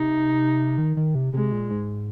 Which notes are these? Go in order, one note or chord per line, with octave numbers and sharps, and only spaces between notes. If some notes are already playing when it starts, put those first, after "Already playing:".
Already playing: C3 D#4
D#3
D#3
C3
C3 G#3
A#2
G#2